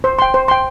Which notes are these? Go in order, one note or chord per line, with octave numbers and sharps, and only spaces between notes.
C5
G5 C6
C5
G5 C6